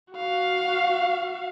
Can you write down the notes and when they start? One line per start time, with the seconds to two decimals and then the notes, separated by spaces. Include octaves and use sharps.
0.13 F#4 F5